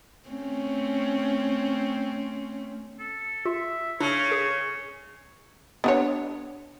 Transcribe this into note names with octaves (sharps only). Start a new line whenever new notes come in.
A3 C4 C#4
A4
F4 E5
C#3 D4 C#5
G#4
B3 D4 C#5